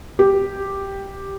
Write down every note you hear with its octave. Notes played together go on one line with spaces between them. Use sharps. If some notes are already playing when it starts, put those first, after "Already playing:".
G4